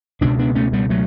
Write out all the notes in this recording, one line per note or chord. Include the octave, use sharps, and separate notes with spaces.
C#2 B2 B3 D4
B3 D4
A3 C#4
G3 B3
F#3 A3